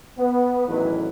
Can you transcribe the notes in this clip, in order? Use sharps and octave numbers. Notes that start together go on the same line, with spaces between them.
B3
A1 E2 A2 D#3 F#3 B4